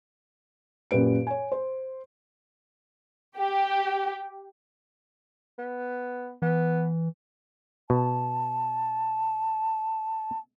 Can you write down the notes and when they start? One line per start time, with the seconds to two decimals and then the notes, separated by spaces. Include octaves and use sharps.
0.91 F#2 A#2 G4 B4 D7
1.27 C#5 G#5
1.52 C5
3.37 G4
5.59 B3
6.42 E3 B3
7.90 B2 A5